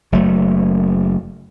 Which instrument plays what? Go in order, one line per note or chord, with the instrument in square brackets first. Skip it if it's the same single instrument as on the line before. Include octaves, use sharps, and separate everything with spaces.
[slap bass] F#1 F#3 A3